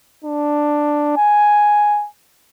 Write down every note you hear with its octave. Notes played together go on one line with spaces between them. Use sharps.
D4
G#5